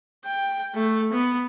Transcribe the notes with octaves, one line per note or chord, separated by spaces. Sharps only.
G5
A3
B3